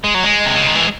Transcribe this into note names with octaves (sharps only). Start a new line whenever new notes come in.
G#3
F#3
G#3
C3
C#3
D#3
E3